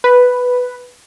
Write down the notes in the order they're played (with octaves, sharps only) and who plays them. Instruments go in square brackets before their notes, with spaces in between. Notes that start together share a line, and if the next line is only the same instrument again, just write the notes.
[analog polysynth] B4